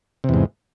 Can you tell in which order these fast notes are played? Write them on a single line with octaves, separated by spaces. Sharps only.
C3 E2 G#2